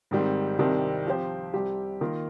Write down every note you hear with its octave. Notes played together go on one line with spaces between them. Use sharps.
G#2 D#3 G3 C4
C2 C3 D#3 G3 C4
F3 C4 G4 C5
C2 C3 G3 C4 G4
D#3 A#3 F4 A#4